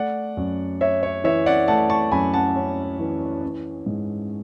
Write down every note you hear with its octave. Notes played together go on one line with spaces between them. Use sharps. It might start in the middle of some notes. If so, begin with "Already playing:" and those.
Already playing: A3 D5 F#5
F#2
C#4 C#5 E5
C#5
E3 C#5 E5
D5 F#5
A3 F#5 A5
A5 C#6
F#2 G#5 B5
F#5 A5
C#4
E3
C#4
G#2